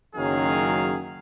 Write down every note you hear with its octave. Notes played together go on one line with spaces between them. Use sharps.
F#1 D#3 F#3 C#4 G#4 F5